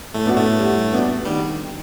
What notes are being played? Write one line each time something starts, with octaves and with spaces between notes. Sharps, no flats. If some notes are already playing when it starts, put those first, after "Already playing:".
A2 A3
B3 D4 F#4
A2 A3
G3
B3 D4 F#4
D#3 G3